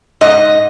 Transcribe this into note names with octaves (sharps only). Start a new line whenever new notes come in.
G#2 D#5